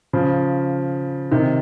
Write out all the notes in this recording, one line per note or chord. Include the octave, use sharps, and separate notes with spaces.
C#3 F3
C3 D#3